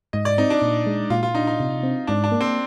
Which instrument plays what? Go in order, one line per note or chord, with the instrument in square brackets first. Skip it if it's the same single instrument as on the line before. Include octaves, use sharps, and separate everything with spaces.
[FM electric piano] G#2 [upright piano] D#5
[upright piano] D5
[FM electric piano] C4 [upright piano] D#4
[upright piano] D4
[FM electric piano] A#2
G#3
[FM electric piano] A#2 [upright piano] F4
[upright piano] F4
[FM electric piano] D4 [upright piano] D#4
[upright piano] D#4
[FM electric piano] C3
C4
[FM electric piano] G#2 [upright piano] D4
[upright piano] D4
[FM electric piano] A#3
[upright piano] C4